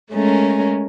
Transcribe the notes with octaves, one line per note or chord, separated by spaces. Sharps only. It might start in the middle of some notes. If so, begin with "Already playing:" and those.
G#3 A3 C#4 A#4